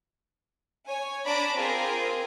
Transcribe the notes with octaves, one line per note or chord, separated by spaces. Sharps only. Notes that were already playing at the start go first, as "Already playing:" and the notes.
C#5 G#5
D4 D5 A#5 B5 D6
C4 F4 G#4 A#4